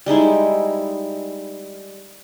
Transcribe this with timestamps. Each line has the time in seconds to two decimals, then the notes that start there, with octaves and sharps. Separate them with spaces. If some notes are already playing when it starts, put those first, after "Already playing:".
0.06 G3 G#3 D#4 E4